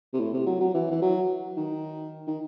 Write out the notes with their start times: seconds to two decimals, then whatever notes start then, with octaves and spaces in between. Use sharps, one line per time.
0.13 C3
0.19 A2
0.34 C3
0.47 F#3
0.61 F#3
0.75 E3
0.91 E3
1.02 F#3
1.57 D#3
2.27 D#3